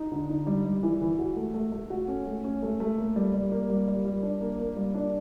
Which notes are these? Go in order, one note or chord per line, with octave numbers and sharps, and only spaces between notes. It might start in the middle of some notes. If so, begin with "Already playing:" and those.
Already playing: D#4
D3
D#4
G3
G3
E3
E3
F#4
A3
A3
A3
F#4
C#4
A3
C#4
A3
A3
A#3
G3
G3
A#3
G3
G3
G3
D4
A#3
A#3
G3
D4